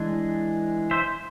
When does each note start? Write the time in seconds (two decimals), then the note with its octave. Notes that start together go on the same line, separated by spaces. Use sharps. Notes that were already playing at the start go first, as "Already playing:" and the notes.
Already playing: E3 G#3 D4
0.91 C5 E5